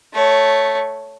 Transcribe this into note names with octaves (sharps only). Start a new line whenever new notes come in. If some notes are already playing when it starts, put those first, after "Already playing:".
A3 C#5